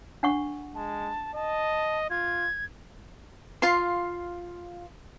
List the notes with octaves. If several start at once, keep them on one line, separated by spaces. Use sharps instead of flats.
D4 F#5 C#6
G#3 A5
D#5 A5
F4 G#6
F4 F5 C6